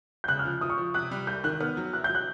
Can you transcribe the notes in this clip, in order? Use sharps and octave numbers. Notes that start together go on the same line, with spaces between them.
G6
C#3 F#6
F6
F3
F3 D#6
C#6
F3
C3 F#6
G3
C2 G6
D#3 F#6
B3 F6
F#3
E4 F#6
G6
F#3
F#6